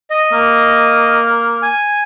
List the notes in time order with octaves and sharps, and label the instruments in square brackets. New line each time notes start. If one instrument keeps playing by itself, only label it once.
[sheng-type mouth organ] D#5
[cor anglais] A#3
[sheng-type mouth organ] G#5